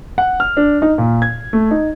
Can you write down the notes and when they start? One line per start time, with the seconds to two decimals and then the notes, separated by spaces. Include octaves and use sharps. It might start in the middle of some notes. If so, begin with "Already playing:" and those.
0.18 F#5
0.40 F6
0.57 D4
0.82 D#4
0.98 A#2
1.22 G#6
1.53 A3
1.71 D#4